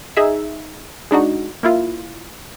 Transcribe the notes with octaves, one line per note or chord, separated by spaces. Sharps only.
D#4 G#4 E5
G#3 D4 D#4 F#4
A#3 E4 F4